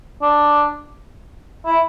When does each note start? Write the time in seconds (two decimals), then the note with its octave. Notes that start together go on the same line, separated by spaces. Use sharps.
0.22 D4
1.66 E4